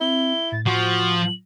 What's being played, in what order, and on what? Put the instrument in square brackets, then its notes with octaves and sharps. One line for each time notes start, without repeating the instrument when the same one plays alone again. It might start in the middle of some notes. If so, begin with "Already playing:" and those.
[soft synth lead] C4 [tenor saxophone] E4 [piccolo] G7
[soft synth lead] A2 [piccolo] A6
[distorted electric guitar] F3 [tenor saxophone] F#4 [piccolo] F#7